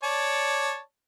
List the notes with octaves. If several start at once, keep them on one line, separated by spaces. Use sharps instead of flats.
C#5 D5 A5